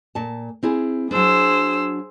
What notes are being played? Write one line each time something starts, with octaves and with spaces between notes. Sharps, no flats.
A#2 A5
C4 E4 G#4
F#3 D4 G#4 C5 E6